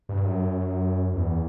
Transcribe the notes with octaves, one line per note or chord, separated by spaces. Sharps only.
G2
F#2
E2